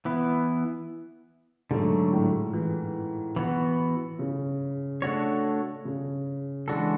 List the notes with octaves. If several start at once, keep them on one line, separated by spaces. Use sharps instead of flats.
E3 B3 E4
G#2 D3 F#3 A3
A2
E3
E3 B3 F#4
C#3
A3 D4 F#4 C#5
C#3
E3 G#3 D4 F#4 A4